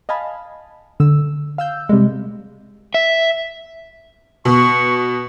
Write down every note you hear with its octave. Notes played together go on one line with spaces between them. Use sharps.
D#5 F5 G#5 A5 B5
D3 E6
F5 E6 G6
C3 G3 G#3
E5
B2 C#6